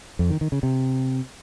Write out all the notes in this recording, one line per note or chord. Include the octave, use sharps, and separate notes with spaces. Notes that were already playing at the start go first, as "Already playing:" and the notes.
F2
D#3
D#3
C#3
C3